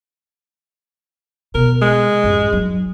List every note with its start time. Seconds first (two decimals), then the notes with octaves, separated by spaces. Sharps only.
1.55 B2 A#4
1.81 G#3
2.24 A1 F#2
2.52 F#3 D#4